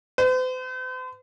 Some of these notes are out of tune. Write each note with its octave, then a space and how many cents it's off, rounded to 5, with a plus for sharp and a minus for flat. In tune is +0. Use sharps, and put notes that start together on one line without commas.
C5 -45